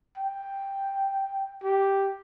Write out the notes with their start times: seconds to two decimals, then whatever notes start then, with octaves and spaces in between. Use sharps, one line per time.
0.17 G5
1.63 G4